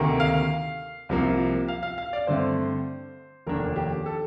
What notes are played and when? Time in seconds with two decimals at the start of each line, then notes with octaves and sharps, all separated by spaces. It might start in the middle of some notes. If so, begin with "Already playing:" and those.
Already playing: D2 C3 D#3 A#3
0.20 F5
1.09 C2 C3 F3 A#3
1.68 F5
1.83 F5
1.98 F5
2.13 D5
2.27 G2 D3 A3 C4 C5
3.47 F1 D#2 D#3 A#3 D4 A#4
3.76 G4
4.06 A4